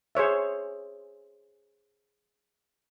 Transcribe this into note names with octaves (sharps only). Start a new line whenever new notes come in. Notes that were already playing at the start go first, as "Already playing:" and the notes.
G#4 C5 C#5 E5